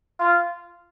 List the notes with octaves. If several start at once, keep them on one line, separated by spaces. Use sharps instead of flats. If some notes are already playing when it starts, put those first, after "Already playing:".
F4